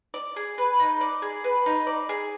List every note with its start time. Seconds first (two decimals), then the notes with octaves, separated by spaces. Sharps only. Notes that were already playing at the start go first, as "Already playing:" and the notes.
0.14 D5
0.36 G#4
0.58 B4
0.79 D#4
1.01 D5
1.22 G#4
1.44 B4
1.66 D#4
1.87 D5
2.09 G#4